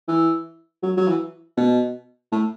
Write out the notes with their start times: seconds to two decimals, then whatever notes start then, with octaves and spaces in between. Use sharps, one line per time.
0.08 E3
0.83 F#3
0.97 F#3
1.08 E3
1.57 B2
2.32 A2